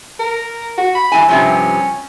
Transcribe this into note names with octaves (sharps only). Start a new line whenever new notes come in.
A#4
F#4
B5
G2 E3 G#5
G2 C3 F3 C#4